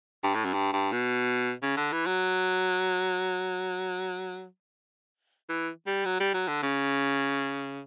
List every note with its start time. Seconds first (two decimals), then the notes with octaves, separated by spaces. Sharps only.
0.24 G2
0.35 A2
0.45 F#2
0.54 G2
0.73 G2
0.92 B2
1.63 C#3
1.77 D3
1.92 E3
2.06 F#3
5.49 E3
5.87 G3
6.05 F#3
6.20 G3
6.34 F#3
6.48 D3
6.63 C#3